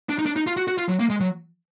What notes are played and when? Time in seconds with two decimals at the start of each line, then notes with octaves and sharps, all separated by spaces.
0.09 D4
0.19 D#4
0.26 D4
0.36 D#4
0.47 F4
0.57 F#4
0.68 F#4
0.78 F4
0.89 F#3
0.99 A#3
1.10 G#3
1.20 F#3